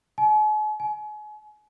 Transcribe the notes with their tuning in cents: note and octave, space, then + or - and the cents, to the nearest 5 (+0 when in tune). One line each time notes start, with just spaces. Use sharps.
G#5 +45
G#5 +35